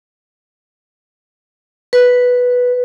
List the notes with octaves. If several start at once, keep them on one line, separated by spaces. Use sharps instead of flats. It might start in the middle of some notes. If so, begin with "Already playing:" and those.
B4